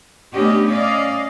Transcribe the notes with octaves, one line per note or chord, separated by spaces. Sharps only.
A3 B3 C#4 D4 G4 D#5
C#4 D5 D#5 F5